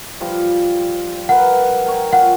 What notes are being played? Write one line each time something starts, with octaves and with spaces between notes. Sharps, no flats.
F3 G3
A#4 B4 F#5
A#4 C#5 G5
F4 F#5